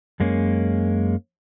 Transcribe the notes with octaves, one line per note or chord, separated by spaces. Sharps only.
F#2 G#3 A#3 C#4